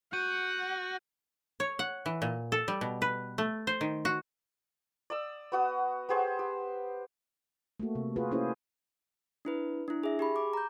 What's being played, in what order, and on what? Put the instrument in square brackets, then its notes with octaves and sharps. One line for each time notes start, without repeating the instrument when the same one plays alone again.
[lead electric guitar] F#4 [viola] F#5 [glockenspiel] G6 D#7
[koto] C#5
F#5
E3
A#2
A4
G3
B2
B4
A3
C5
D#3
F#4
[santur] D5 D#6 E6
B3 F#4 D#6
B3 G4 G#4 C5
G4
[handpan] A3 A#3 F#4
C3
F4 F#4 G#4 B4
A#3 C#4 E4 F4 G#4 C5
[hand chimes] D4 E4 B4
D4 E4
G#4 E5
G4 G#4 B5
D6
A#5 G6